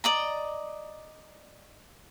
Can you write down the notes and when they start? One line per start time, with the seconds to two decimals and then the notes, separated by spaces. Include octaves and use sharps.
0.04 D5 D#5 A#5